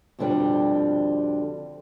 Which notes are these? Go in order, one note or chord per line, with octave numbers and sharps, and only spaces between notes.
F2 B2 D3 G3 C4